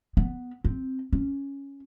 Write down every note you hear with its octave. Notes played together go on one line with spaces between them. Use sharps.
B3
C4
C#4